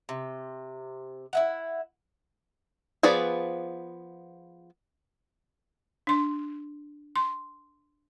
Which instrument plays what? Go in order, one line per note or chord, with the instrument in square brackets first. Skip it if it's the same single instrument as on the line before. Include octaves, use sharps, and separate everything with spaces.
[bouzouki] C3
E4 E5 F#5
[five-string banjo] F3 B3 G#4 B4 D5
[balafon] D4 C6
C6